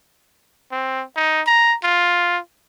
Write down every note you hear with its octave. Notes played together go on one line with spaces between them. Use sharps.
C4
D#4
A#5
F4